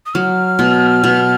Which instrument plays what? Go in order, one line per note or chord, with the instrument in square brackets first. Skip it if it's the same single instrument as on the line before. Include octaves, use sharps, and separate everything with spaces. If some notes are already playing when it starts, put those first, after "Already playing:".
[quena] D#6
[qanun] F#3 [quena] F6
[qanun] B2
B2